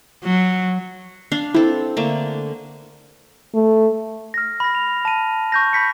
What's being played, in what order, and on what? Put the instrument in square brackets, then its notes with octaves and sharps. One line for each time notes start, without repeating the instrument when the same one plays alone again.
[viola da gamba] F#3
[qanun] D4 F5
[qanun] C4 A4 [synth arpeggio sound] E4
[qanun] D3 A3 A#3
[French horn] A3
[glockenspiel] F6 A#6
B5 A#6
F7
A5 D#7
C#6 G6 A#6
B5 G6 B6 C#7